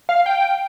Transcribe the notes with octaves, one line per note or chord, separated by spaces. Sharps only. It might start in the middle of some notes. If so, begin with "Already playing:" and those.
F5
G5